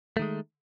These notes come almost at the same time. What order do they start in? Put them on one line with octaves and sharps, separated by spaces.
A3 D#3 G#3